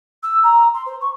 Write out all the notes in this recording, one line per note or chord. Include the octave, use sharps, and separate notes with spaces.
E6
A#5
C6
C5
C#6